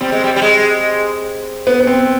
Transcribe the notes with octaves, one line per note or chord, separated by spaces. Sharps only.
G3 C4
G#3
G3
G3
G#3
B3
B3
C4